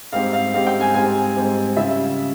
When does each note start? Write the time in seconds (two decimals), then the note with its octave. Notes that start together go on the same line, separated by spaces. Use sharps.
0.12 G#2 G3 C4 G4 F5
0.33 F5
0.54 G#2 G3 C4 G4 F5
0.67 G5
0.81 G#5
0.94 G#2 G3 C4 G4 G#5
1.35 G#2 G3 C4 G4
1.76 C#3 G3 C#4 F4 E5